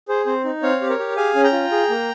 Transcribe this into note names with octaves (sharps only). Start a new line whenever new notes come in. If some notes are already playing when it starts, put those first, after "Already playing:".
G#4 C5
C4 C5
D#4
C4 C#5 F5
G4
A#4 C#5
G4
G#4 F5 G#5
C#4
G5 A#5
F4
G#4
A#3